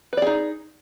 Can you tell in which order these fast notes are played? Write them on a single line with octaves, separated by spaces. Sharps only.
B4 D5 G#4 D#4